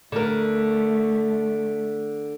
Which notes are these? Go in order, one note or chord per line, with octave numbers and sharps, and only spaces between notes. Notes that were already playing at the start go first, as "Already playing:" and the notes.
D3 A3 A#4